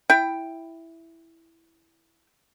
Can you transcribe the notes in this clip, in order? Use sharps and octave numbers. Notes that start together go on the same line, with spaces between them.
E4 G5